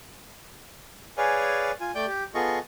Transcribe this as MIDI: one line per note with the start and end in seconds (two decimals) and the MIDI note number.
1.17 1.71 68
1.17 1.71 71
1.17 1.71 73
1.17 1.71 74
1.17 1.71 77
1.17 1.71 80
1.80 1.92 65
1.80 1.92 80
1.95 2.06 57
1.95 2.06 74
1.95 2.06 79
1.95 2.06 91
2.07 2.23 67
2.34 2.59 59
2.34 2.59 65
2.34 2.59 68
2.34 2.59 69
2.34 2.59 75
2.34 2.59 85